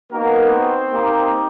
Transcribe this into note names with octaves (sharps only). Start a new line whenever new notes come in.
A#3 B3 D#4 F#4 A#4
C4 C5
A#3 D#4 G4